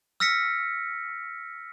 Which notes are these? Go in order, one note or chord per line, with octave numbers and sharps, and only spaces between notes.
E6 F6 A#6 B6 C#7